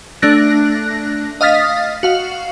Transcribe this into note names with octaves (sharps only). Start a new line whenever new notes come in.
A3 D4 F#6 A#6
D#5 F5 D#6 F6 A6 B6
F#4 F5